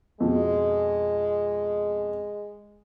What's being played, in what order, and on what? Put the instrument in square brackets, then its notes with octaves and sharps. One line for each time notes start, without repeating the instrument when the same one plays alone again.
[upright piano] F2 B2 [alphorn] G#3